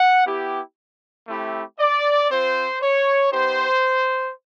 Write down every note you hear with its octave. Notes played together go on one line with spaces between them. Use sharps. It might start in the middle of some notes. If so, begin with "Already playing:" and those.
Already playing: F#5
B3 E4 G4
A3 C4 E4 G4
D5
C4 F4 C5
C#5
B3 D#4 G4 C5